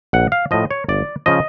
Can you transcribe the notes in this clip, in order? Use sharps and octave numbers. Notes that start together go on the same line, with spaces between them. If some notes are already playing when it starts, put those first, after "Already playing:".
A#1 F#5
F5
A2 F3 D#5
C#5
G1 D5
C#3 F3 D#5